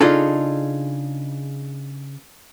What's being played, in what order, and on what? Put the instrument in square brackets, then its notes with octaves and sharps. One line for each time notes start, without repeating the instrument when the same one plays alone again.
[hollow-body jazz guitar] C#3 D4 D#4 F4 G#4 A4